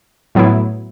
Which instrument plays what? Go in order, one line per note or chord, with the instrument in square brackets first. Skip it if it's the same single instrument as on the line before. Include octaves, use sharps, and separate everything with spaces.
[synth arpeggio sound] A2 F#3 B3 E4